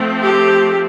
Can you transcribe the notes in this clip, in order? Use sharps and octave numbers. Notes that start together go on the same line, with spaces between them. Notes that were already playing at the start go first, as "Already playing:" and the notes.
Already playing: F3 A3 C4
G4